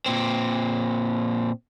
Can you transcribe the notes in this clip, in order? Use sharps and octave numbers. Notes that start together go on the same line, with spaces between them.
A#2 C4